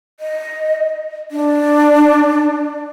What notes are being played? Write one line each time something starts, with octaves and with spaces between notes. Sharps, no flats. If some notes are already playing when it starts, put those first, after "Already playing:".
D#5
D4